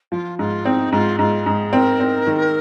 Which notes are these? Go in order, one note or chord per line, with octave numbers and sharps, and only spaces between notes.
F3 F4
G#2 F4
C4 D#4
G#2 F4
G#2 F4
G#2 G#4
C4 A#4
C4
D#3